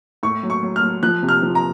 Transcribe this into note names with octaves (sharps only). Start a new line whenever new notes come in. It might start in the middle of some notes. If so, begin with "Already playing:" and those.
A2 C#6
F#3
C#6
F#3
F6
F#3
F3 F#6
C3
F6
F3
A#5